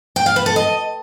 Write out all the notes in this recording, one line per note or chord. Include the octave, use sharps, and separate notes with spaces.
G5
F5
B4
A4
D#5